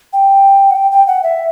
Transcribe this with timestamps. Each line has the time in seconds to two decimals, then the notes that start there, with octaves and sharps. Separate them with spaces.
0.13 G5
0.71 F#5
0.76 G5
0.92 G5
1.07 F#5
1.23 E5